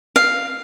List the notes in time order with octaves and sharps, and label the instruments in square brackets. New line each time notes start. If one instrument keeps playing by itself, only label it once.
[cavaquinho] F5